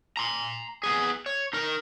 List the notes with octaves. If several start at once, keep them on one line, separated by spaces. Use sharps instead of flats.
A#5 C6
B3 G#4
C#5
D#4 A#4